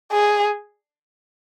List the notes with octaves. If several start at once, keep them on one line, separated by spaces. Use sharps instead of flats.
G#4